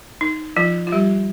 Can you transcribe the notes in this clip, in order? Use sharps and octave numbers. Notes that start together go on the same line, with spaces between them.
D#4
F3 F4
F4
G3 G4